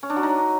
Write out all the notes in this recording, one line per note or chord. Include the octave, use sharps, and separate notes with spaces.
C#4
D4
F#3
D#4